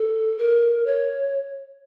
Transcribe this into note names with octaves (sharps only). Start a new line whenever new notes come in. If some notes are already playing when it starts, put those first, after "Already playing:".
Already playing: A4
A#4
C#5